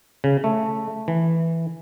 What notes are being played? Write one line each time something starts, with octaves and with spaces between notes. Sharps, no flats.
C#3
A3
E3